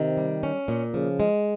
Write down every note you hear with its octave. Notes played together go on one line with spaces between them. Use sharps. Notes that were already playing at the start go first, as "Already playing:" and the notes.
Already playing: C3 D#3 C4
G3
C#4
A#2
C#3 F3
G#3